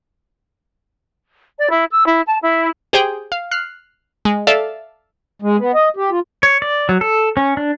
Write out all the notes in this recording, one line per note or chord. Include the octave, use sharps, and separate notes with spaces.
D5
E4
E6
E4
A5
E4
G4 G#4 C5 G5 G#5
F5
F6 F#6 C7
G#3
A4 D5 E5 F5 A5
G#3
B3
D#5
G4
F4
C#5
D5
F#3
A4
C#4
D4